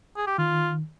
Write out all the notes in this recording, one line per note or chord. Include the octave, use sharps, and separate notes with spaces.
G#4
G4
D#3 F4